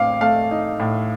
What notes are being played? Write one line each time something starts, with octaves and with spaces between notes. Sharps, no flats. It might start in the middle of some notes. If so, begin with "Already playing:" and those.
Already playing: A2 C4 F5 D6
A3 F5
D#4
A2